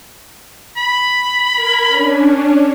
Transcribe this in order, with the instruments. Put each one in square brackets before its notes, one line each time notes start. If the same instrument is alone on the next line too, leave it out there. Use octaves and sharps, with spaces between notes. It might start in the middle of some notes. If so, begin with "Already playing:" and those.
[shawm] B5
[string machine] A#4 G#6
C#4 D4